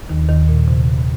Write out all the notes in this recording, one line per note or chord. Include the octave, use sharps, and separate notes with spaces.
D#2 D#3
D#2 D#3
A#2
C3